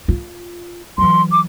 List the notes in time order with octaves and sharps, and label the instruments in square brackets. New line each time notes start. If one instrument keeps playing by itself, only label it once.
[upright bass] F4
[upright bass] E3 F#3 [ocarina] C6
[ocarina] D6